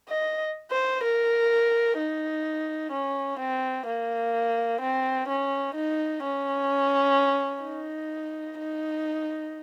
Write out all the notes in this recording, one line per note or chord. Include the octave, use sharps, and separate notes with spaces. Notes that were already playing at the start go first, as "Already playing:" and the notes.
D#5
C5
A#4
D#4
C#4
C4
A#3
C4
C#4
D#4
C#4
D#4
D#4